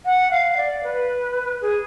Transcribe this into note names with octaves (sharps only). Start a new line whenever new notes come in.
F#5
F5
D5
B4
G#4